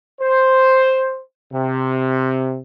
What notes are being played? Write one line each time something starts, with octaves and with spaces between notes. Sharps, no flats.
C5
C3